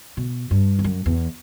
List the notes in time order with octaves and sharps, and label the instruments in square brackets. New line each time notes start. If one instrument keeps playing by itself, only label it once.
[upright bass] B2
G2
E2
F#2
E2